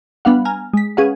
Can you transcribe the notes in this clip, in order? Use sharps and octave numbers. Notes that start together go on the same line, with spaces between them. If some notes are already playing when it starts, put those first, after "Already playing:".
G3 B3 D4 F5 F#5
G#5 A#5 F6
G#3 B6
C#4 G#4 B4 F5 F#5